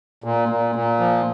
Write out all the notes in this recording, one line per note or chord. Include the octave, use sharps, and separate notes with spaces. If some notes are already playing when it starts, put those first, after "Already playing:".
A#2
A#2
A#2
F3